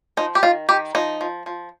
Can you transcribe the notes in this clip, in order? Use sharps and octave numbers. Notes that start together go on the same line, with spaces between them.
F3 D#4
G4
D#3 F4
D#3 G4
F3 D#4
F3
F3